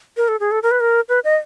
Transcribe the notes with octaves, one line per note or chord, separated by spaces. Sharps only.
A#4
A4
G#4
A4
A#4
B4
A#4
B4
D#5